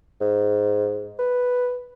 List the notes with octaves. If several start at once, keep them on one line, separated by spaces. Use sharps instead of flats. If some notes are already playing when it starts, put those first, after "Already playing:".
G#2
B4